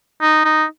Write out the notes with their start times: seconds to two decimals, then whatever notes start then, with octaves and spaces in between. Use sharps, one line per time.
0.22 D#4
0.45 D#4